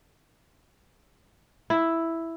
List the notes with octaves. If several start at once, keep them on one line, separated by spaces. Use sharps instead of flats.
E4